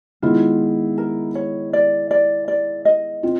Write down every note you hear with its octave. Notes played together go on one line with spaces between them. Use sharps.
D#3 G#3 B3 E4 F4
A#4
C#5
D5
D5
D5
D#5
C4 F4